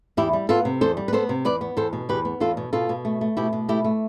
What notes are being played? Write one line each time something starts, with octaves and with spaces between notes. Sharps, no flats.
E2 E4 G4
G3
B3 F4 A4
C3
E2 A4 C5
G3
B4
B3 A4 C5
C3
E2 B4 D5
B3
E2 A4 C5
B2
E2 G4 B4
B3
E2 F4 A4
B2
B2 F4 A4
B2
A3
A3
B2 E4 G4
B2
A3 E4 G4
A3